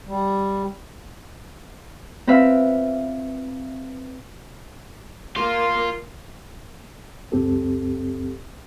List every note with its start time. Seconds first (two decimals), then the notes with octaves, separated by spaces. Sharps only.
0.07 G3
2.27 C4 F4 B4 C5 E5 F5
5.36 A#3 F4
7.32 C#2 F#2 C4 G4 A4